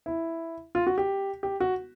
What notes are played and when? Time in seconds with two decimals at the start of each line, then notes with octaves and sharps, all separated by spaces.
0.06 E4
0.75 F4
0.87 F#4
0.98 G4
1.43 G4
1.60 F#4